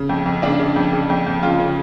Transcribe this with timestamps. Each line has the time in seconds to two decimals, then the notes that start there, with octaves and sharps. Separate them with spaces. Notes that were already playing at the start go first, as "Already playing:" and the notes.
Already playing: C#3
0.09 F2
0.26 F2
0.42 C#3 D4 D5
0.59 C#3
0.76 F2
0.93 C#3
1.10 F2
1.26 F2
1.42 C#3 F4 F5
1.59 C#3